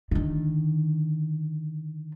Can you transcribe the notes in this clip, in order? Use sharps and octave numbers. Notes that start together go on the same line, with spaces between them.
D3 D#3